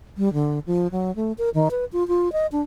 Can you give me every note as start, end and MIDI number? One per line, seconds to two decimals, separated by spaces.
0.18 0.32 55
0.34 0.59 50
0.66 0.87 53
0.92 1.14 54
1.16 1.33 57
1.38 1.50 70
1.54 1.69 51
1.71 1.85 71
1.93 2.06 65
2.08 2.32 65
2.32 2.47 75
2.52 2.62 62